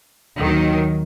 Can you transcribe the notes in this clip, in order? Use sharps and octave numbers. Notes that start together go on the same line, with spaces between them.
D#2 D#3 F#3